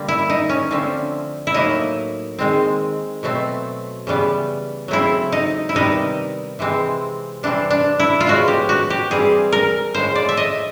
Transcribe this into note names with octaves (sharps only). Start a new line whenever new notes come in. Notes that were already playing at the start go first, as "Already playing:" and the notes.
Already playing: D3 G3 A#3
E4
D#4
C#4
D3 F3 A3 C4
E4
A2 F#3 A#3 D#4
D#3 G#3 C4
B2 F#3 A3 C4
C#3 E3 G3 B3
C#3 F#3 A3 C4 E4
D#4
E4
C3 D#3 G3 B3 D#4
C3 E3 G#3 C4
C3 E3 G3 C4 D4
D4
E4
F4
A2 F3 G#3 B3 F#4
G4
F#4
G4
E3 G3 C4 G#4
A#4
A2 F3 G#3 C5
D5
E5
D#5